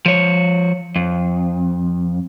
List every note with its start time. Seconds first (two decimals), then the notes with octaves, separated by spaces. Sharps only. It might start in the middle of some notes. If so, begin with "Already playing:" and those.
0.06 F3 C#5
0.96 F2